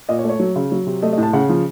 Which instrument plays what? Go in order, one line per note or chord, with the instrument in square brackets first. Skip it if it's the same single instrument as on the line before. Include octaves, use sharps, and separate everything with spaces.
[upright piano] A#2 D#5
C#5
A3
C#5
F#3
C#3
F#3
C3
A3 D#5
D#5
A2
A5
C#3 F#5
F3